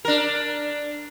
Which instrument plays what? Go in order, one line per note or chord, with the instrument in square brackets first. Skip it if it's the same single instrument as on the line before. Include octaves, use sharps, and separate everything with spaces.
[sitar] D4 A#4